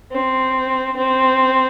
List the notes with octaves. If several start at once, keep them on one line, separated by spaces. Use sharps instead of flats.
C4
C4